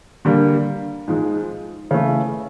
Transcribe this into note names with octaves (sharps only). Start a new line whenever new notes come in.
D3 G3 A#3
G#2 F3 G#3
C#3 E3 A3